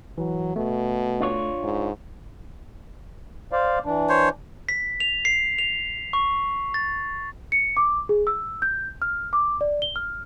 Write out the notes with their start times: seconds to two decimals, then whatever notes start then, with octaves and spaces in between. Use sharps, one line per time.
0.18 E3 F#3
0.56 B2 A3
1.20 D4 F4 C#5
1.63 G#2
3.52 C5 D5 F5
3.85 E3 D4
4.09 C5 C#5
4.69 B6
5.00 F7
5.25 C7
5.58 F7
6.13 C#6
6.74 A6
7.52 C#7
7.77 D6
8.09 G#4
8.27 E6
8.62 G6
9.02 F6
9.33 D6
9.61 D5
9.82 G7
9.96 F6